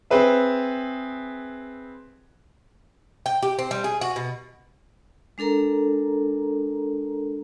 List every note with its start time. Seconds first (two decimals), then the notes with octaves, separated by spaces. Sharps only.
0.10 C4 G#4 B4 E5
3.26 G5
3.42 G4
3.59 C4
3.71 G3
3.84 G#4
4.01 F#4
4.16 B2
5.38 G#3 D4 A4 A#4 A#5